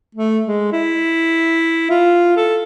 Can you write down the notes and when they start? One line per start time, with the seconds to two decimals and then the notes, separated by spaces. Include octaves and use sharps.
0.15 A3
0.47 G#3
0.72 E4
1.90 F4
2.37 A4